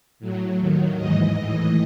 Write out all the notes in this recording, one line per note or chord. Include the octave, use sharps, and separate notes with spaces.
A2 F#3
D#2 D#3 F#3
G#2 E3 D#5
A2 E3